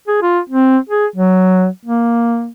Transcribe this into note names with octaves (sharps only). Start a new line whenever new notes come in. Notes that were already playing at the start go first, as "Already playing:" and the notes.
G#4
F4
C4
G#4
F#3
A#3